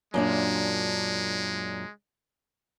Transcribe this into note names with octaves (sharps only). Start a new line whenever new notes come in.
F#2 A#2 G#3 D4